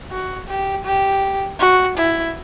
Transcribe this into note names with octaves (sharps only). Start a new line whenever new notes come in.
F#4
G4
G4
F#4
E4